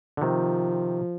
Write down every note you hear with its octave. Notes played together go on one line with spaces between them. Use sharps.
D3
C3 D#3 F3